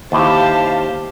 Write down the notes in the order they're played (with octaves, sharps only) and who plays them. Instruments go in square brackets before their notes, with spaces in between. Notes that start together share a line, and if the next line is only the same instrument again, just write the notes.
[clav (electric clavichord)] D#2 E4 [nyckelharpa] G4 C5 [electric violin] F5 A5